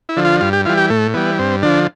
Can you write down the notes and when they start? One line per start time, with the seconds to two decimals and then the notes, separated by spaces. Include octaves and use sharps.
0.09 E4
0.17 D3 F3
0.25 F4
0.41 G2 F4
0.53 G4
0.65 E3 G3 F4
0.77 G4
0.90 A2 A3
1.14 E3 G3 B3
1.39 G2 C4
1.63 D3 F3 D4